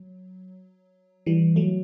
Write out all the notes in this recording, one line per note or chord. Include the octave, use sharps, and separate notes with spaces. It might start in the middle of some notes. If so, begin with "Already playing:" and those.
Already playing: F#3
E3 G3
F#3 A3